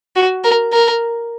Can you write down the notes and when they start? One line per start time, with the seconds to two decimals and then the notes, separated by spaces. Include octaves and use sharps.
0.16 F#4
0.44 A#4
0.73 A#4